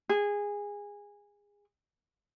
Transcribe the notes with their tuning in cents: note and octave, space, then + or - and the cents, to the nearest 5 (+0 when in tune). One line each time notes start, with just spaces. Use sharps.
G#4 -20